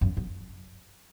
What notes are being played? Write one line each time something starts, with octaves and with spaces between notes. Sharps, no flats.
F#2
F#2